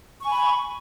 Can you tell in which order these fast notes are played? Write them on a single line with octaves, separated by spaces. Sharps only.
C#6 G#5 B5